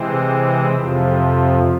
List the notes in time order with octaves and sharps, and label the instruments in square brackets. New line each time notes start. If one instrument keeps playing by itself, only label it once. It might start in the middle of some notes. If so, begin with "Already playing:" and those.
Already playing: [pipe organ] C3 E3 G#3 C4
F2 C3 F3